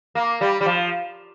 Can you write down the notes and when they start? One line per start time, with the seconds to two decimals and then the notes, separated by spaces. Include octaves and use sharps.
0.15 A#3
0.41 G3
0.61 G3
0.66 F3